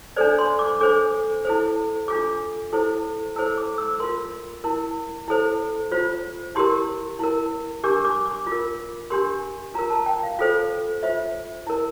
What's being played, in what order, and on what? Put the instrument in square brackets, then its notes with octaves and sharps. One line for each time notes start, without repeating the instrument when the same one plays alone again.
[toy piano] D4 A4 C5 D5
C6
D6
D4 A4 C5 D6
E4 A4 C5
D4 F4 A4 D6
E4 A4 C5
E4 A4 C5 E6
D6
E6
F4 A#4 C6
E4 A#4
E4 A4 C5
F4 C5
E4 G4 A#4 C6
E4 A#4
D4 G4 A#4 D6
D6
D6
F4
A#4
D4 G4 A#4 C6
F4 A#4 A#5
A5
G5
F5
F4 A4 C5
F4 C5 E5
E4 A#4